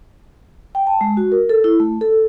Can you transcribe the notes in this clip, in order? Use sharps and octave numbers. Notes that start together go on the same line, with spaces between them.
G5
A5
G#3
F#4
A#4
A4
E4
A3
A4